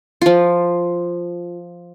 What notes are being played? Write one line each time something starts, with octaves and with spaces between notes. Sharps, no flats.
F3 F4